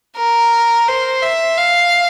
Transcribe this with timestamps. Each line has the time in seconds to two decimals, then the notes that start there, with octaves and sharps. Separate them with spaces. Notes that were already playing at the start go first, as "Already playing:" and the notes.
0.17 A#4
0.88 C5
1.23 E5
1.58 F5